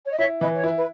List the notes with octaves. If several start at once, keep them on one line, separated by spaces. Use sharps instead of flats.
C#5
D#5
E4 C#5 E5
E3 B4 D#5
C#5
E4 B4
B4